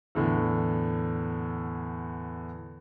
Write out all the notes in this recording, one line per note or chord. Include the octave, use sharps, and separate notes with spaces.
E2 A2 D3